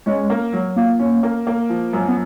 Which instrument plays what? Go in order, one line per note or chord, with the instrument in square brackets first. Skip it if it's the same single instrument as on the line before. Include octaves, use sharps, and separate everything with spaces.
[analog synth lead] G#3 [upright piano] C#4
[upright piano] A#3
F#3
[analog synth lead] A#3 [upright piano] F4
[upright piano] C#4
A#3
A#3
F3
F#2
[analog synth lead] B3